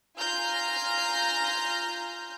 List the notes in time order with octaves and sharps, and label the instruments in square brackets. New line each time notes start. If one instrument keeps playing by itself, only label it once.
[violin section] F4 G#5 A#5 F6 G6 A#6